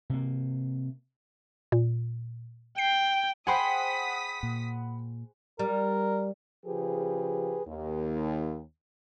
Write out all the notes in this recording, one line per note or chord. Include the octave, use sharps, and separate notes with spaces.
C3 A#3
A#2
G5 C7
G#4 C5 F#5 G5 B5 D#6 B6
A#2
G3 A#4
C#3 F3 G4 G#4 B4
D#2